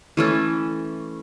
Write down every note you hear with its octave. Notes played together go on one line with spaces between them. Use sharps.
E3 A3 C#4 A4